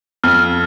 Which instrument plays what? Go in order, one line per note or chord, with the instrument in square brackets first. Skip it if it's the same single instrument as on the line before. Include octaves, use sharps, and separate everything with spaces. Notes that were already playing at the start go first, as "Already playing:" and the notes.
[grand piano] F2 [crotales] F6